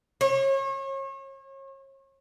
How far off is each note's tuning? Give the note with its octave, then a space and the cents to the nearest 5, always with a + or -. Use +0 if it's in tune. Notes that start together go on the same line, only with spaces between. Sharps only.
C#5 -35